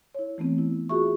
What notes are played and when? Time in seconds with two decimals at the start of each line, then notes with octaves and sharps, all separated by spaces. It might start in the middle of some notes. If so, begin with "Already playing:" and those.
0.15 E4 C#5
0.38 E3 A3 B3 C4
0.58 E4
0.89 F4 F#4 G#4 E5 C#6